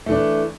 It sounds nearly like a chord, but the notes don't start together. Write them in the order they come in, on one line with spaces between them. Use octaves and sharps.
A3 E3 D4